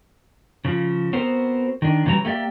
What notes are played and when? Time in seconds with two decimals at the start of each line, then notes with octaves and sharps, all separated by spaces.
0.65 C#3 F3
1.13 B3 C4 F#4 A#4 C5
1.82 D#3 D4
2.05 F2 C#3 E3 F#3 G3 A#5
2.25 A3 A#3 G4 D5 E5